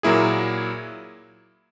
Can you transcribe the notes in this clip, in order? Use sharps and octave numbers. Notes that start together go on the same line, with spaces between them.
A#2 F#3 A#3 E4 G#4